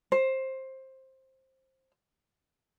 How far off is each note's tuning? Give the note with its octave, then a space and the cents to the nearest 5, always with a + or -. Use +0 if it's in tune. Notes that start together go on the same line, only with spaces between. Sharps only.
C5 +15